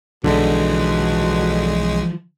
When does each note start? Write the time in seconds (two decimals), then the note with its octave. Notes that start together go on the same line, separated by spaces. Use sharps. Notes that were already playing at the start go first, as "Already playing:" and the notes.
0.24 B1 B2 D3 E3 F3 G#3